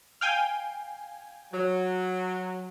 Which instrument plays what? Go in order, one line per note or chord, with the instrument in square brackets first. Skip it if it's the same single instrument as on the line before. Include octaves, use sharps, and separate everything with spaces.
[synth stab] F5 G5 G#5
[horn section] F#3